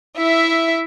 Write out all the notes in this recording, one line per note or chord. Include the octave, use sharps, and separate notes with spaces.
E4 E5